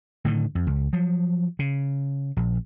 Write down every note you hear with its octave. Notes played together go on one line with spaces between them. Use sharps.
A2 D3 D#3
F2
C#2
F3 F#3
C#3
A#1